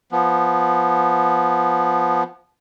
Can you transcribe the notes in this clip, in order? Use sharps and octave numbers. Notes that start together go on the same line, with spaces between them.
F3 B3